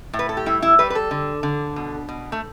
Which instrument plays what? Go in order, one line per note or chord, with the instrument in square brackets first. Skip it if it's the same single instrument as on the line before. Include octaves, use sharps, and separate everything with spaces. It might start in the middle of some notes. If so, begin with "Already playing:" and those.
[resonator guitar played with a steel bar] A2
B4
A4
G4
G3 E4
E4
G3 B4
B4
A4
D3
D3
B2
B2
A3